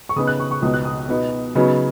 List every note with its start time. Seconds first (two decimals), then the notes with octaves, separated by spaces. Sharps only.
0.09 C#6
0.16 C#3 B3 D#4 D#6
0.27 F#6
0.40 C#6
0.51 C#6
0.62 C#2 B2 B3 D#4 D#6
0.74 F#6
0.85 D#6
1.09 B2 B3 D#4
1.55 C#3 F#3 B3 D#4